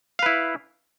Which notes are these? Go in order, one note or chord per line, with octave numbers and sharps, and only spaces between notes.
E4 B4 F5